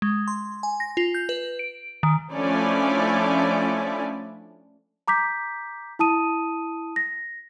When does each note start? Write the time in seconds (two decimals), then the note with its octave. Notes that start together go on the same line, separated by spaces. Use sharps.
0.02 G#3
0.28 C6
0.63 G#5
0.80 A#6
0.97 F4
1.14 G6
1.29 B4
1.59 D7
2.03 D#3
2.33 F3 A3 C#4 D4 E4 D5
5.08 A#5 D6 G6 B6
5.99 E4 A5 D#6 D#7
6.96 A#6